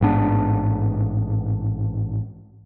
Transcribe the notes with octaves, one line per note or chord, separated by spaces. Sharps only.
A1 G#2 B3 D4